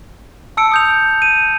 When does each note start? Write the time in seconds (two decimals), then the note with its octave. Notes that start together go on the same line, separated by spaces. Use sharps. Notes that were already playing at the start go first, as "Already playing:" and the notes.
0.57 A5 E6 C#7 D7
0.72 D#6 G6 F7
1.22 D#7